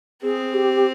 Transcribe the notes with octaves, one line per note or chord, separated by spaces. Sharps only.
C4 G#4
G4